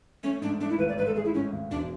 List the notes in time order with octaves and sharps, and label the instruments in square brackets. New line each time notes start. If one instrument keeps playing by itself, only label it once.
[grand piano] A3 [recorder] C#4
[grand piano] G#2 [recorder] D4
[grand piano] A3 [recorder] D4
[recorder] E4
[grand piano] G#1 [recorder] B4
[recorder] D5
[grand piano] G#2 [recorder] B4
[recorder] A4
[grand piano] A3 [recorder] G#4
[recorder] E4
[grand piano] G#2 [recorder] C#4
[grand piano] G#1
[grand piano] E1 [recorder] D4